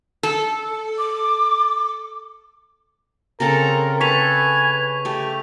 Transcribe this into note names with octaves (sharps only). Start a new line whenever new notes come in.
A4
D6
C#3 C4 A4 A#4 A#5
A4 B4 G#5 C#6 B6 F7
A3 G4